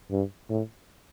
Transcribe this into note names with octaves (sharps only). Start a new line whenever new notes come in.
G2
A2